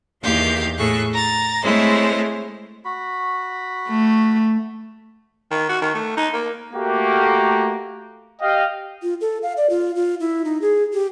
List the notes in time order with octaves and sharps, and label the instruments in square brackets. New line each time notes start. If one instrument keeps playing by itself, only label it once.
[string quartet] E2 D#3 A#3 G4 F5 G6
A2 G#4 A4 C#6 F#6
A#5 A6
G#3 A3 C4 E4 C5 C#5
[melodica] F#4 B5
[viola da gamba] A3
[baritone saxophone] D#3
F#4
D#3
A3
D#4
A#3
[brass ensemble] A3 A#3 F#4 G4
G4 D#5 F5 G5
[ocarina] F4
A4
F5
D5
F4
F4
E4
D#4
G#4
G4